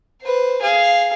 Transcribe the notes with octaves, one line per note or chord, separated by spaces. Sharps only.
B4 C5
G#4 F5